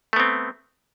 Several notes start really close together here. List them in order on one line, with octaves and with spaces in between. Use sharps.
A3 B3 C4